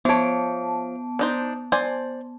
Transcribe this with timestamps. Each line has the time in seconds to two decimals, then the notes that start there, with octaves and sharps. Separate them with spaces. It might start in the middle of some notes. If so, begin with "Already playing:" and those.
0.05 F3 B3 C#5 A5
1.19 D4 D#4 C5
1.72 C5 D5 G#5